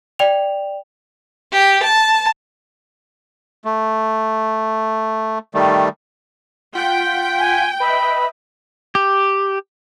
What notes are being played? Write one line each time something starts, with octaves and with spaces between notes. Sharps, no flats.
D5 G5 F7
G4
A5
A3
D#3 G3 A3
F4 F#5 G5 B6
G#5
B4 D#5 E5 B5
G4